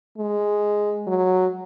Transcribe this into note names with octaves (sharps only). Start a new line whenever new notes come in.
G#3
F#3